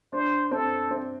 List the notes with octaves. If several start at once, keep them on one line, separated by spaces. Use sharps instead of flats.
D4 C5
C4 A4
C4